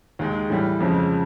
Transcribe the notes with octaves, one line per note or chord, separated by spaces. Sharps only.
D#2 D#3 G#3
A2 E3 G3
F2 C#3 F3 G#3